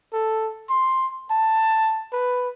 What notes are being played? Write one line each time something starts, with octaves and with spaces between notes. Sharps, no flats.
A4
C6
A5
B4